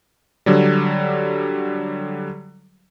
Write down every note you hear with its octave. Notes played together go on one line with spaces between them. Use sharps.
D3 F#3 G3